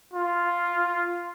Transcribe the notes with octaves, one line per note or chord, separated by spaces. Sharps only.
F4